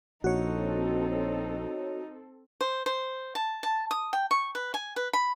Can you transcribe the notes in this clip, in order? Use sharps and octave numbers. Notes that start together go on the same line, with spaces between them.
A#1 C4 D#4 F#4 A4 C#5
C5
C5
A5
A5
D#6
G5
C#6
B4
G#5
B4
B5